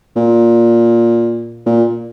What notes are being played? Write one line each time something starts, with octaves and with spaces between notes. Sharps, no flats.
A#2
A#2